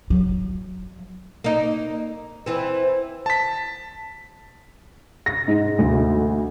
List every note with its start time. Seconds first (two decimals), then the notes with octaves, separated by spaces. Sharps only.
0.10 F#3
1.44 A#3 D#4
2.46 E3 C4
3.26 A5 B6
5.26 A#6
5.48 G#2
5.79 D2